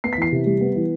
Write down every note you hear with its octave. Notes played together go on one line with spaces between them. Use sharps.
B3 C7
B6
E3 C7
C3
G3
B3
E3